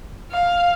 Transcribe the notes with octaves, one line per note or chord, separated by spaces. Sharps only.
F5